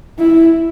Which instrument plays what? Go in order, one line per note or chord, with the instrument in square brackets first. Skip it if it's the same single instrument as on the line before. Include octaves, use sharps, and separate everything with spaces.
[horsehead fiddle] E4